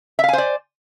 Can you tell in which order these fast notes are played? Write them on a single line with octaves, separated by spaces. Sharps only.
E5 F5 G#5 C5 D5